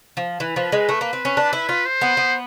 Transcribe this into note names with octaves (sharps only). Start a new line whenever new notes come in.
F3
E3 B4
F3
G#3
A3
A#3
C4
C#4
D4
E4
F4
C5
B3
B3